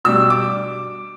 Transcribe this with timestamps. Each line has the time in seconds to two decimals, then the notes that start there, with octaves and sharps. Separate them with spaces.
0.05 B2 G3 D4 E6
0.30 D6